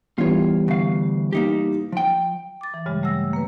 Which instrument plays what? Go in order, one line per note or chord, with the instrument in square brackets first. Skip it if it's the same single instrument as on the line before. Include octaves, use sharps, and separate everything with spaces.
[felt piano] E3 G3 B3 [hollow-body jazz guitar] F4 C#5
[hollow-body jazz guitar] D2 F5
A#3 D#4 G4
F3 G5
[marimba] D6 A6
E3
G2 C#3 G3 G#3
G3 A3 F#5 E6 A#6
A#3 B4